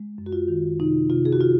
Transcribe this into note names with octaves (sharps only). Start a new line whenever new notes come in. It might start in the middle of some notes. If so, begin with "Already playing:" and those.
Already playing: G#3
F#2
F#4
F4
D#3
C3 D#4
C3 F4
G#4
F#4
C3 F4